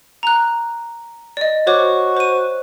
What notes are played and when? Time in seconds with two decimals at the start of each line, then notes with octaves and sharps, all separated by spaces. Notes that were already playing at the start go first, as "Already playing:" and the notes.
0.23 A#5 F#6
1.37 D5 D#5
1.67 F#4 C5 C#5 D6
2.17 C5 D#7